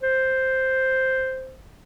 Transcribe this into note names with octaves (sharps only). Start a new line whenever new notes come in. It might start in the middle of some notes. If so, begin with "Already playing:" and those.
C5